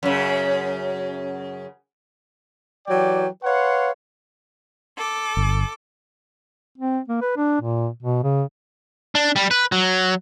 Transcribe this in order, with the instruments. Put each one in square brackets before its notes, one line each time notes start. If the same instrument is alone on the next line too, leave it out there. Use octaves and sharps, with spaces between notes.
[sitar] F#2 C#3
[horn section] E3 F#3 G4 D5 G5
B4 C#5 F5 F#5 C6
[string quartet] A4 D6
[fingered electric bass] G1
[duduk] C4
A#3
B4
D4
A#2
B2
C#3
[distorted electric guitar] D4
G3
B4
F#3